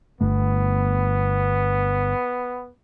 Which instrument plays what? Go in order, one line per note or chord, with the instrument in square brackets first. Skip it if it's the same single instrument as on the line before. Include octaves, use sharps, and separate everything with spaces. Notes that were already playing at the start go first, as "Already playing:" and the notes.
[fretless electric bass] G1 A3 [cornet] B3